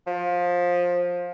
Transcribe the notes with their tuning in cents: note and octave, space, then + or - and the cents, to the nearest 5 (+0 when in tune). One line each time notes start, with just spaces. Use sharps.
F3 +20